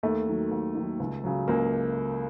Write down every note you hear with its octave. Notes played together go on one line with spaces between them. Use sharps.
D#2 A3
D#3 F#3
D#2
D#3 F#3
C#2
C#3 F#3
C#2 A#3